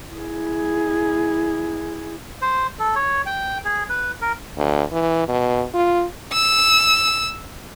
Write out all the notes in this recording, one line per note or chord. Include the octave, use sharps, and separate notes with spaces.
E4 G#4
C5
A4
C#5
G5
G#4
B4
A#4
D2
E3
B2
F4
E6